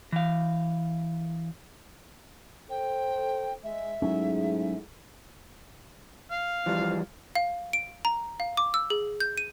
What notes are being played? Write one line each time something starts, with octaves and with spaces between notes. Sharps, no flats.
E3 F5
A4 C5 G5
G#3 E5
G#2 F#3 A3 C#4 E4 G#4
F5
E3 F3 G3
F5
D7
A#5
F5
D6
E6
G#4
G6
D#7